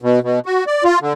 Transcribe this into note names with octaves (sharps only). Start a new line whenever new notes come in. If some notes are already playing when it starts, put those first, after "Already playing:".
B2
B2
F#4
D5
F4
D3